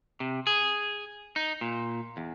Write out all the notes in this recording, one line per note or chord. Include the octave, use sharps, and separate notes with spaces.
C3
G#4
D#4
A#2
E2